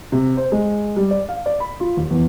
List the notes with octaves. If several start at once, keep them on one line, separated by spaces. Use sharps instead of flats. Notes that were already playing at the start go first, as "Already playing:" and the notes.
C3
C5
G#3
G3
D5
F5
D5
B5
F4
D#2
E2